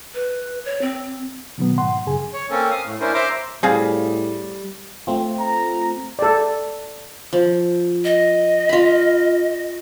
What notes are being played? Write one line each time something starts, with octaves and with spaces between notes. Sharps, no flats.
B4
C#5
C4
B2 D#3 F#3 B3
G#2 F#5 C6
F#2 C#3 G#4 G#5
C#5
A#3 C4 C#4 A4
F5 D#6
A2
C#4 D4 E4 A#4 C5
C5 E5 A#5 C6 D6
A2 G3 C4 G#4 F5
A3 C4 F4
A#5
A4 D5
F3
D#5
F4 B5